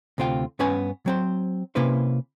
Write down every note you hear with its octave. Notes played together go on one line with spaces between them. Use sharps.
D2 C3 C4 F4 G5
G2 B3 C#4 B4 G#5
F#3 C4 C5
C3 A#3 C#4 E4 B4 C5